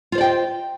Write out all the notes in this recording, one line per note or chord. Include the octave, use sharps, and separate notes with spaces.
F4 C5 D5 D#5 G5